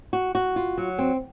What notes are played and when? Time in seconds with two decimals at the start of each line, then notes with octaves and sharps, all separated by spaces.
0.13 F#4
0.35 F#4
0.56 F4
0.78 F#3
0.99 C4